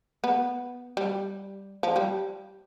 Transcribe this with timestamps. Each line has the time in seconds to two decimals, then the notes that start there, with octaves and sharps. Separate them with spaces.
0.24 B3
0.97 G3
1.83 F3
1.96 G3